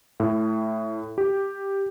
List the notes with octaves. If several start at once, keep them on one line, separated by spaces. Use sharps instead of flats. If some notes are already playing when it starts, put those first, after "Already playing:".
A2
G4